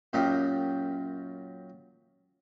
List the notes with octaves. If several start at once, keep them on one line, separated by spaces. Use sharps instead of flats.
F#2 A#2 D#4 G4